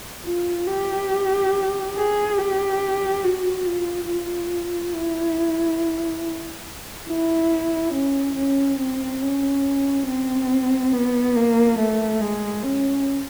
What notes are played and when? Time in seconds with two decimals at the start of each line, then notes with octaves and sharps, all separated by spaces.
0.24 F4
0.67 G4
1.95 G#4
2.38 G4
3.24 F#4
3.66 F4
4.09 F4
4.95 E4
7.08 E4
7.93 C#4
8.36 C#4
8.79 C4
9.21 C#4
10.07 C4
10.93 B3
11.36 A#3
11.78 A3
12.21 G#3
12.63 C#4